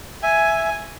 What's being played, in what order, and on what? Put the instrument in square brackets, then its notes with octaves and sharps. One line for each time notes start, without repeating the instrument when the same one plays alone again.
[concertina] E5 [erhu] G#5